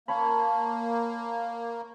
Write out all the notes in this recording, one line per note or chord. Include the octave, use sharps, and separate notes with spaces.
A#3 C#5 A5 B5